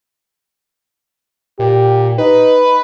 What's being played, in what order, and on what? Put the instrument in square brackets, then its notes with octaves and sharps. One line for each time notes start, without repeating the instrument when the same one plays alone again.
[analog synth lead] A#2 [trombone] G4
[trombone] D#4 [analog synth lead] B4